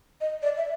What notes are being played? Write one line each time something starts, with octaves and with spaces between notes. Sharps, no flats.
D#5
D5
E5